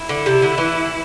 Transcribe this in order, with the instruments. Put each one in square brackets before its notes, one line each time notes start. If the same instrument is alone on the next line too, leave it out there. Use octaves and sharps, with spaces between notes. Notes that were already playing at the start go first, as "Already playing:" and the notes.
Already playing: [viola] E4
[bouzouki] D3
C3
D3
E3